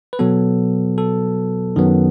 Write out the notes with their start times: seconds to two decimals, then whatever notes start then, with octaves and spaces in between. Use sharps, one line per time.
0.13 B4
0.19 B2 F#3 B3 A4
0.98 A4
1.76 F#2 D#3 F#3 B3